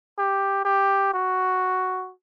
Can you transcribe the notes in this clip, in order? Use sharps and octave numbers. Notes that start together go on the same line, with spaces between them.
G4
G4
F#4